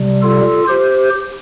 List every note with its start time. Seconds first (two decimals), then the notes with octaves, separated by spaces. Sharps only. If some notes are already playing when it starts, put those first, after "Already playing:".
Already playing: C3 G3
0.22 F4 A4
0.68 G4 C5